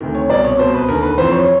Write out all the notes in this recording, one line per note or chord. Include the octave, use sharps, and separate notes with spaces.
D2 C3 D#3
C#5
C2 B2 D5
C#5
C2 B2 C5
B4
D#2 D3 A#4
B4
F2 C3 E3 C5
C#5